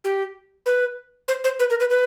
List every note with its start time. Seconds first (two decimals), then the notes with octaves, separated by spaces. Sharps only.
0.04 G4
0.66 B4
1.28 C5
1.44 C5
1.59 B4
1.70 A#4
1.80 B4
1.90 B4